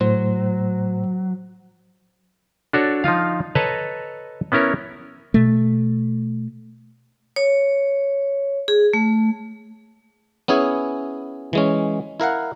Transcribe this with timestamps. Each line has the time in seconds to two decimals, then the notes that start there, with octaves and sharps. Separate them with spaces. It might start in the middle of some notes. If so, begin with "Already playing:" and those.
0.01 A2 F#3 C5
2.73 D4 F#4 A4 C#5
3.04 F3 D#4 F4 F5
3.55 A4 B4 C#5 D#5 A5 A#5
4.52 B3 C#4 E4 A#4 C#5
5.34 B2 A3
7.36 C#5
8.68 G#4
8.93 A3
10.48 B3 C#4 E4 G#4
11.53 E3 G#3 C#4
12.20 E4 A#4 F5 F#5